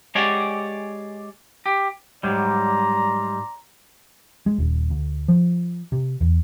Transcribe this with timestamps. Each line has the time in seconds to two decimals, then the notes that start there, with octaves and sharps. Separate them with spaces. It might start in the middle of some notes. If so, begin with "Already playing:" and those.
0.15 G#3 G4 G#4 C#5 D5 F#5
1.66 G4
2.23 G#2 F#3 G3 D5 A#5 C6
4.46 G#3
4.58 D#1
4.90 D2
5.28 F3
5.92 C3
6.21 E2